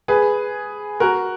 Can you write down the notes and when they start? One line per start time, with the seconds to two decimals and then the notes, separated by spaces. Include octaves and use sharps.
0.08 G#4 B4
1.00 F#4 A#4